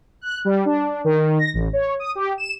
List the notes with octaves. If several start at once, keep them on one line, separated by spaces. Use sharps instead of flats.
F#6
G3
D4
D#3
A#6
A1
C#5
D#6
G4
E7